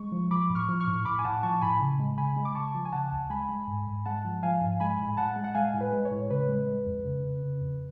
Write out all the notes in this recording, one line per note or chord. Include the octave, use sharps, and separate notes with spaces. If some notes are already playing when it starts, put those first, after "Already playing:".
Already playing: G#3 C#6
F3
F3 B5 D6
A2
C#6 F6
F3
C#6 F6
A2
A2 B5 D6
G#5
A2 F#5 A5
F3 A5 C#6
A2 G#5 B5
C#3
G#3
C#3 G#5 B5
G#3
D6
C#3 A5 C#6
F3
G#5
C#3 F#5 A5
D2
G#3 G#5 B5
G#3
G#2
G#2
G#3 F#5 A5
F3
F3 F5 G#5
G#2
G#3 G#5 B5
A2
A2 F#5 A5
G#3
F#5
G#3 F5 G#5
A2
B4
G#3
C#5
A2
C#3 B4
G#3
G#3
F2
C#3
C#3
C#3
F2